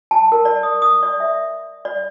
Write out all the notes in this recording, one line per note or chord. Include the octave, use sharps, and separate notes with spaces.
A5
A#4
D5
D#6
D#6
D5
E5
D5